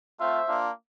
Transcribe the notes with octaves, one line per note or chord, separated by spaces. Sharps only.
A3 C4 F4 C5 E5
A#3 D4 F4